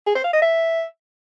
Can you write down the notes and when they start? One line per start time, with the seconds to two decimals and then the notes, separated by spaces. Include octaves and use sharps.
0.06 G#4
0.15 C5
0.24 F5
0.33 D#5
0.42 E5